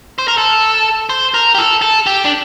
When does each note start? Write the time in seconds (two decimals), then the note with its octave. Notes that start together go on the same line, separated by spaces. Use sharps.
0.19 C5
0.28 A#4
0.38 A4
1.10 C5
1.34 A#4
1.55 G4
1.58 A4
1.82 A4
2.07 G4
2.25 D4